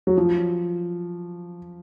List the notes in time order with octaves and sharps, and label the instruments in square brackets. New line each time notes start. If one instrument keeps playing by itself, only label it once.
[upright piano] F#3
F3